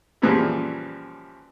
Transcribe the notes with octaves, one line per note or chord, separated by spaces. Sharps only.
F#2 A#2 C#3 E3 F3 G3